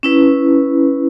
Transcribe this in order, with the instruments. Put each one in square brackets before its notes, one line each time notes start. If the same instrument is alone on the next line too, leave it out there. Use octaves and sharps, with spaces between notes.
[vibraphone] C#4 E4 B4